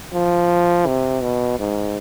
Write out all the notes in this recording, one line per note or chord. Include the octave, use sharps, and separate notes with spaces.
F3
C3
B2
G#2